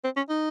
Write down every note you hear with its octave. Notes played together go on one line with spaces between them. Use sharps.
C4
C#4
D#4